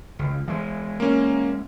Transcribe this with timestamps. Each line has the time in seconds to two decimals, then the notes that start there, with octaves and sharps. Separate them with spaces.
0.19 C#2
0.48 E3 G#3
1.00 A#3 C#4